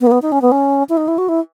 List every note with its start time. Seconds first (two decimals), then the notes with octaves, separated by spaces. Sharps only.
0.01 B3
0.07 A#3
0.11 B3
0.22 D#4
0.32 C#4
0.42 B3
0.52 C#4
0.89 E4
0.97 D#4
1.08 E4
1.18 F#4
1.29 E4